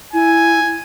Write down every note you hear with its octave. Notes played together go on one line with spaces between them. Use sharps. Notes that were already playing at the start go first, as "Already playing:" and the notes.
E4 G#5